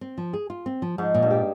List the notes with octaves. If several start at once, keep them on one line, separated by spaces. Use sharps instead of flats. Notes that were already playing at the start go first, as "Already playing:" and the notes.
C4
F3
G#4
F4
C4
F3
G#2 F3
A#2
G2
G4